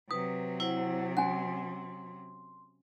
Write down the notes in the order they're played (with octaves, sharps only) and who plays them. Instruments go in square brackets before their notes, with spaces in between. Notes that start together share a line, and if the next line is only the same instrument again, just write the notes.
[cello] C3 F#3 [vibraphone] B4 [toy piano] D#6
[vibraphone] E4 C5 F#5
[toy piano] C#4 G#5 [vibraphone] C6